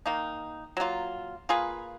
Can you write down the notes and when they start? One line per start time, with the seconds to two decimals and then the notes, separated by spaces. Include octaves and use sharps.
0.06 D#3 A#3 D#4
0.77 F#3 A#3 F4
1.49 A#3 F4 G#4 B4